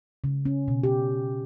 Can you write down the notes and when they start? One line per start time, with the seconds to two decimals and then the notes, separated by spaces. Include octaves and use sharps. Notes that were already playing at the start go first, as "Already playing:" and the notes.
0.24 C#3
0.45 C#4
0.68 B2
0.83 G4